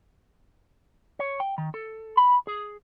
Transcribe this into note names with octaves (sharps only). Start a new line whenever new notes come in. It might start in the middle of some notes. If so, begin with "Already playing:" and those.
C#5
G5
D#3
A4
B5
G#4